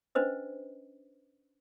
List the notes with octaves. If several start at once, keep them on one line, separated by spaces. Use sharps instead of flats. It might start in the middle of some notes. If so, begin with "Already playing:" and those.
C#4 D4 B4 C5 D#5